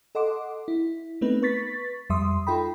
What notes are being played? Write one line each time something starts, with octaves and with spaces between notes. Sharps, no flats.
A4 D#5 F#5 C6 D6
E4
A3 B3 C4 D#4 B4
B4 C#6 A6 B6
F2 G3 E5 C6 D#6
D#4 F4 A4 G5 B5